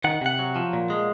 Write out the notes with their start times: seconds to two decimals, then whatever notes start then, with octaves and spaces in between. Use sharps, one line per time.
0.04 D#3 F#5
0.21 C3 F#5
0.39 F#3
0.56 F3
0.73 A#2
0.90 G#3